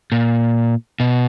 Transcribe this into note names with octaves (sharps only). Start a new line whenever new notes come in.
A#2
B2